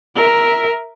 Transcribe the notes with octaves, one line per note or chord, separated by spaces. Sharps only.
A#4 E5